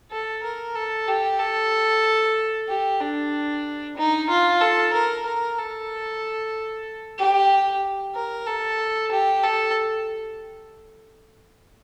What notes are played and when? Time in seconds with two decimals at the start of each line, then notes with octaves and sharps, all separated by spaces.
0.11 A4
0.44 A#4
0.76 A4
1.08 G4
1.40 A4
2.68 G4
3.01 D4
3.97 D#4
4.30 F4
4.61 A4
4.94 A#4
5.26 A#4
5.58 A4
7.19 G4
8.15 A#4
8.47 A4
9.12 G4
9.44 A4